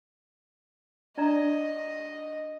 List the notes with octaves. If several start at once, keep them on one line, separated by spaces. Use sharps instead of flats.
D4 D5 D#5 A#5